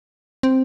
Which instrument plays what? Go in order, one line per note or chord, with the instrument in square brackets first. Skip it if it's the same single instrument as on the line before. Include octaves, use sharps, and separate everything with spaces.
[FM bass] C4